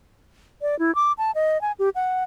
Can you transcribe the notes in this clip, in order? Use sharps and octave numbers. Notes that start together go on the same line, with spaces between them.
D5
E4
D6
A5
D#5
G#5
G4
F#5